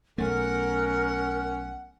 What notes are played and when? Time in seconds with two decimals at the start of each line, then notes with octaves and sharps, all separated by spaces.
0.18 B1 A3 C#4 A#4 F#5